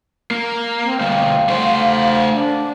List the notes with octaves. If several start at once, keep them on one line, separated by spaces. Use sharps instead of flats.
A#3
C4
D2 G3 F5
A3 C5
D4